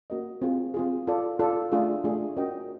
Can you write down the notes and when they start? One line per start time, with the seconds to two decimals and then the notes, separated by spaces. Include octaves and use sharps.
0.10 A#3 C#4 F#4 A#4 D#5
0.42 C4 F4 G#4
0.74 C4 F4 G#4
1.07 F4 A4 D5
1.39 F4 A4 D5
1.72 A3 D4 F4 G#4
2.04 A3 D4 F4 G#4
2.37 C#4 F#4 A#4 D#5 G5